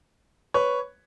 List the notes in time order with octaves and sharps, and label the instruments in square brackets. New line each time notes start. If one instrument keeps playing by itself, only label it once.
[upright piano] B4 C#5